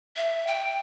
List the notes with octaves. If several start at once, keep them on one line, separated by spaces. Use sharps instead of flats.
E5
G5